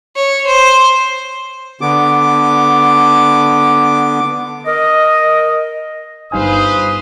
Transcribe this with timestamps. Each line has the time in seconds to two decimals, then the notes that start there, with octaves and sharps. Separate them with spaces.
0.16 C#5
0.46 C5
1.81 D3 B3 D6
4.67 A#4 D#5
6.32 G1 G3 D#4 B4 C5 F5 G#5 D#6